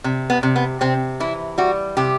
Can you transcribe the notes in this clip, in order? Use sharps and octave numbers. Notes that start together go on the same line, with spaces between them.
C3
B3
C3
B3
C3 C4
E3 E4
G3 F#4
C3 G4